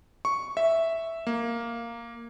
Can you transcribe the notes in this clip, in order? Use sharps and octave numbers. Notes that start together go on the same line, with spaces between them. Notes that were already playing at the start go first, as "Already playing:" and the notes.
C#6
E5
A#3